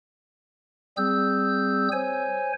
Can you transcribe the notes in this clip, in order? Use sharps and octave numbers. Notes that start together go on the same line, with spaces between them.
G3 C4 G#4 E6 G6
C5 C#5 G#5